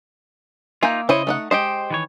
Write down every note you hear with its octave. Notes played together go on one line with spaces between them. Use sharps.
A#3 D#4 F4 E5 G#5
C#3 E4 C5 C#5 D#5
A3 D#4 F#5
G#3 G4 C5 D#5 G5
D#3 E3 C#5